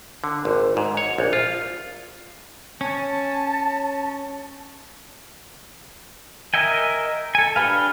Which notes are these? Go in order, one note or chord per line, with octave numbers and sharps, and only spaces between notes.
D3
G#1
G#2
C#5
A#1
F4
C#4 A5
A#4 D#5 E5 G5 G#5
A4 G#5
D4 G4 G#4 B4 F5